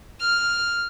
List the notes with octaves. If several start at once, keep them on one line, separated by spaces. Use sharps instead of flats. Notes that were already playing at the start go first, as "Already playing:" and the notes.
F6